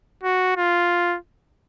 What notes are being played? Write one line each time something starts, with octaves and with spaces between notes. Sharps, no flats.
F#4
F4